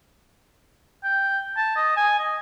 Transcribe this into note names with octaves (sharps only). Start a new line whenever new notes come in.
G5
A5
D#5
G#5
D#5